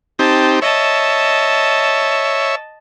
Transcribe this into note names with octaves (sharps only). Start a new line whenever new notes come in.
C4 D#4 G4 A5
C#5 D#5 E5 A5